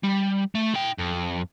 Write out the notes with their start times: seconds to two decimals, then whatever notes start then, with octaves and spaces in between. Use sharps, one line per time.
0.04 G3
0.55 A3
0.74 E4 G5
0.98 F2